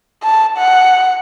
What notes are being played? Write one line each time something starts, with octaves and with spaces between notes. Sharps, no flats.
A5
F#5